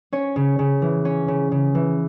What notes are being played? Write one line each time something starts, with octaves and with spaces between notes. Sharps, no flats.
C#4 C#5
C#3
C#3
E3
C#4
C#3
C#3
E3